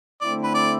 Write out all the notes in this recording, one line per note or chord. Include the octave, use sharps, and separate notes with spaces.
D3 A3 C4 E4 D5
B4
D5